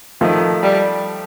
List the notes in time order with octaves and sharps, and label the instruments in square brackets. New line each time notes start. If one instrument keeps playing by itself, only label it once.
[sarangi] D#3 [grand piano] F3 A3
[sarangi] G3